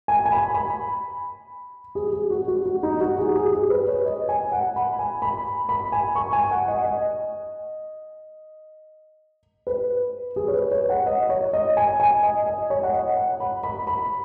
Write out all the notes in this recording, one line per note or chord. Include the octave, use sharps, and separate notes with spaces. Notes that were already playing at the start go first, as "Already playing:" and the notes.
G#5
G#5
B5
B5
G#4
G#4
F#4
F#4
F#4
D#4
F#4
G#4
G#4
G#4
B4
C#5
D#5
G#5
F#5
B5
G#5
B5
B5
G#5
C#6
G#5
F#5
D#5
D#5
B4
G#4
C#5
B4
C#5
F#5
D#5
C#5
D#5
G#5
G#5
D#5
D#5
C#5
F#5
D#5
F#5
B5
B5
B5